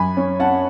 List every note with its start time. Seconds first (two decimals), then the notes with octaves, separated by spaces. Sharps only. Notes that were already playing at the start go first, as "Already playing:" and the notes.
Already playing: F#2 G#5 B5
0.17 C#4
0.40 C#4 F#5 A5